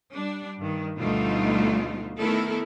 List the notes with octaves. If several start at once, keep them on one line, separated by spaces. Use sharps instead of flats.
G3 D4
G2 D#3
D2 B2 G3 A3 D#4 F4
D#3 A3 B3 E4 A4 A#4